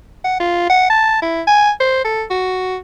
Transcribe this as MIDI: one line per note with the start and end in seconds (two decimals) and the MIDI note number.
0.24 0.38 78
0.40 0.67 65
0.70 0.90 78
0.90 1.19 81
1.22 1.42 64
1.47 1.71 80
1.80 2.02 72
2.05 2.24 69
2.30 2.77 66